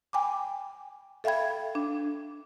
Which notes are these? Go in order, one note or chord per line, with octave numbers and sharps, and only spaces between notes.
G5 G#5 B5 D6
A4 E5 F5 G5 B5 G#6
D4